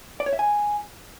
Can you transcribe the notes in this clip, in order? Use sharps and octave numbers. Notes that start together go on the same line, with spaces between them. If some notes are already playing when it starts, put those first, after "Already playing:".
D5
C#5
E5
G#5